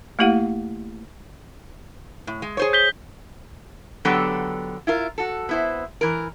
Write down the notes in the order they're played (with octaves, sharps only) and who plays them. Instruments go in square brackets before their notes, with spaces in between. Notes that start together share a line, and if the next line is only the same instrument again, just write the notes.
[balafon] A3 A#3 E4 G4 F5 F#5
[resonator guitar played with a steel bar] A2
G#3
G#4 C5 C#5
[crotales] G6 B6 G7
[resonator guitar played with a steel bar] D3 F#3 B3 G4 A4 G5
E4 F4 A#4
F#4 A4
B3 E4 C5
E3 A#4